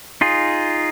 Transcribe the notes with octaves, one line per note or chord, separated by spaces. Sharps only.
D#4 F4 G#4